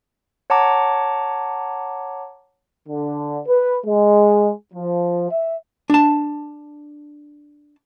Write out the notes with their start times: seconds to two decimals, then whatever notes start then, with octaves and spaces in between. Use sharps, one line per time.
0.50 C#5 F#5 A5 A#5 D6
2.88 D3
3.47 B4
3.85 G#3
4.74 F3
5.30 E5
5.90 D4 A5